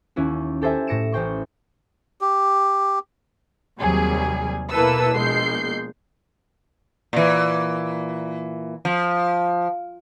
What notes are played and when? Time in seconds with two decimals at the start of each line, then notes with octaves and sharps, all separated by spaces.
0.16 D#2 C#4 E4 F#4
0.62 G4 A4 C5 E5 G#5
0.87 A2 A#6 C#7 D7 E7
1.12 A1 C5 G5 C#6
2.21 G4
3.79 D#2 C3 F#3 G3 G#4
4.70 B2 A#3 E4 A4 B4 E6
5.14 A#1 B2 G#3 G6 C7
7.13 A#2 E3
8.85 F3